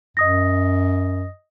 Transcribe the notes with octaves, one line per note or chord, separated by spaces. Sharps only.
F#2 D#5 D#6 A#6